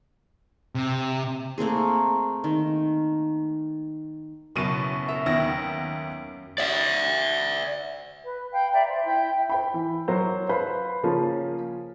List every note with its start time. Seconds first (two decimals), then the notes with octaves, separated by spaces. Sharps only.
0.75 C3
1.58 A3 A#3 C4 G#4
2.44 D#3
4.56 F#1 F#2 B2 A5 D#7
5.08 A#4 E5
5.26 D#2 B3 A#6
6.58 D5 E5
8.23 B4
8.52 F5 G5 B5
8.72 D5 E5 G5 A#5
8.87 C5
9.04 E4 G5
9.50 C5 G5 B5
9.74 E3
10.08 F#3 A#4 C5
10.49 B4 C5 F5 B5
11.03 C#3 F3 A#3 C#4 F4